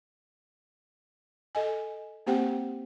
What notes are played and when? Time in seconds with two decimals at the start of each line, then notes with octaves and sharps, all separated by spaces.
1.55 A4 D#5 G#5
2.27 A#3 C4 G4 C5 F#5 G5